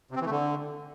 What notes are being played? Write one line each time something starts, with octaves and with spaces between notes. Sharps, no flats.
C3
C4
E3
A3
D3